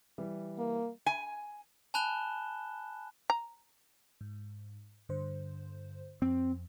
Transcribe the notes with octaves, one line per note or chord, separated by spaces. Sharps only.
E3 G3
A#3
G#5
G#5 A5 B5 F#6 E7 G7
A#5
G#2
G2 D3 C5
F2 C4